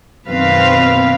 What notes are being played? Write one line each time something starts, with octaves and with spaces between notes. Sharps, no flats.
F#2 B2 D#3 C4 B4 F5